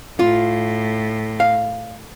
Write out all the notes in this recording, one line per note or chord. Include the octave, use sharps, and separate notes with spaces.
A2 F4
F5